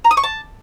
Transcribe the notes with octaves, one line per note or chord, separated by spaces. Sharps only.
A#5
D#6
C#6
A5